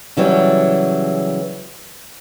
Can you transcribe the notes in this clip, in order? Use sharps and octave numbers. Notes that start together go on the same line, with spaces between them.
C#3 E3 F#3 G3